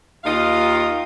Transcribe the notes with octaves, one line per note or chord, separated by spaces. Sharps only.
D#2 D#3 F4 D#5 F5